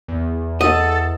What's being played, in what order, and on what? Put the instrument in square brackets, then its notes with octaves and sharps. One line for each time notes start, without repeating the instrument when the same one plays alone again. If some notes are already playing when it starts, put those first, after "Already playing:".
[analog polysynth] E2
[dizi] A4 [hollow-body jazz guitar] D#5 [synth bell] F#5 D#6